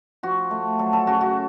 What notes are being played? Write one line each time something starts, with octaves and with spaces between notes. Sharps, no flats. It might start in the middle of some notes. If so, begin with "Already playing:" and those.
F3 F#4
A3
F#3 A4
A4
C#3 F#4
F#4